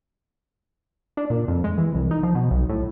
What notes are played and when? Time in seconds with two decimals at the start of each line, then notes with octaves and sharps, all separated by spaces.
1.17 D4
1.30 A#2
1.48 F2
1.64 G#3
1.78 E3
1.94 C2
2.11 D#4
2.23 F3
2.35 B2
2.51 B1
2.69 A2